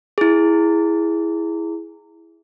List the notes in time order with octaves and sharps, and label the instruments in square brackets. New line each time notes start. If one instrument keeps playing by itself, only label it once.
[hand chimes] E4 G#4